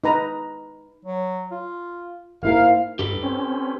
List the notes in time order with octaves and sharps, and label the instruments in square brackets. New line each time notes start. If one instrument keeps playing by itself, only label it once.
[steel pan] D#4 B4 A#5
[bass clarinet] F#3
F4
[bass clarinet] G#2 [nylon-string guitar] A#3 E4 A#4 [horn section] F5
[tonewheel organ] G2 [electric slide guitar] G4 A4 B4
[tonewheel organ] C4 C#4